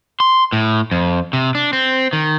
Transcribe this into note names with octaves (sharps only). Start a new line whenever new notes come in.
C6
A2
F2
C3
D4
C4
D#3